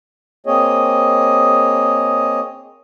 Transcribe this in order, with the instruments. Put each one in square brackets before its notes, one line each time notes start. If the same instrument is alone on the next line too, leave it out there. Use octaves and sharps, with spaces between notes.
[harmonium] A#3 C4 G#4 C#5 D#5